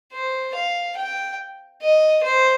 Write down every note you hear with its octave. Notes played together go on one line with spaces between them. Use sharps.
C5
F5
G5
D#5
C5